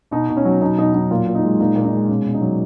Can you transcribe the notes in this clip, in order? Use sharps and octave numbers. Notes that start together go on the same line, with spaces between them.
B2 D#4
B2
C#4
F#3
B2 D#4
B2 D#4
F#3 D#4
A#2 F4
A#2
D#4
G#3
A#2 D#4
A#2
D#4
G#3
B2 C#4
B2
D#4
F#3